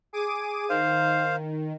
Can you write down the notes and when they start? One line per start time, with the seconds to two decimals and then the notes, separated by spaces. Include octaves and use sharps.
0.13 G#4 D6 D#7
0.70 D#3 C5 F5